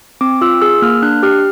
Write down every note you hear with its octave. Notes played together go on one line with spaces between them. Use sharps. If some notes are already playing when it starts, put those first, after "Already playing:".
C4 D6
F4 E6
G#4 E6
A#3 F6
D4 F#6
G4 F6